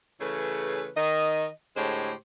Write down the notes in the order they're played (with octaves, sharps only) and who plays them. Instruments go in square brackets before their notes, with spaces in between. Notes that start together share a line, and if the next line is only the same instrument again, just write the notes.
[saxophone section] C#3 E3 A3 C#4 G#4 B4
D#3 D#5
A2 D3 G#3 G4 C5 C#5